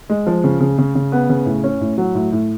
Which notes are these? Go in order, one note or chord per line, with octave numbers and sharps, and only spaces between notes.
G#3
F3
C#3
C#3
C#3
C#3
B3
C#3
A2
C#4
A2
F#3
A2
A2